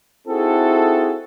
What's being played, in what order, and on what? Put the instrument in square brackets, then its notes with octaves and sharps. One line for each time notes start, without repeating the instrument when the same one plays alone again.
[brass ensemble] C4 D#4 E4 F#4 G#4 A4